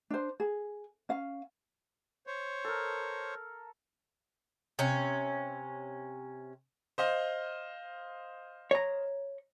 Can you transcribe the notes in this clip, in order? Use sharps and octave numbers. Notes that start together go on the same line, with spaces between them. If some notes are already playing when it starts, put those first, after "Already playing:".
D4 C5
G#4
C#4 F5
C5 C#5
A4 A#4
C3 C#4
C5 D#5 F5
C#5 A#5